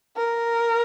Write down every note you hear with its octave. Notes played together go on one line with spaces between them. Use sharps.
A#4